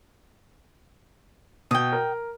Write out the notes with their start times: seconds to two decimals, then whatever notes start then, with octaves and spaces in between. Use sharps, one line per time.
1.71 B2 G5 D#6
1.92 A#4